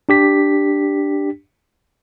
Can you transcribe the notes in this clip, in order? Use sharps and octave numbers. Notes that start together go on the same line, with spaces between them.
D4 G4 B6